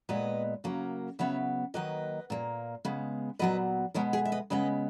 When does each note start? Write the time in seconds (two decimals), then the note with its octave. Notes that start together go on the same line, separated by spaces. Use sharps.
0.09 A#2 G#3 B3 B4 D#5
0.64 C#3 F#3 A#3
1.19 C#3 F#3 B3 C#5 E5
1.74 D#3 F#3 A#3 B4 D#5
2.30 A#2 A#3
2.85 C#3 G#3 B3
3.39 A#2 F#3 B3 B4 D#5
3.94 B2 G#3 B3 A#4 C#5
4.13 G#4 B4
4.25 E5
4.32 B4 D#5
4.50 C#3 G#3 B3 B4 D#5